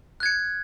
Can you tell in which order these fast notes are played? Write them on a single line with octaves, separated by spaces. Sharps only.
F#6 G#6 C#7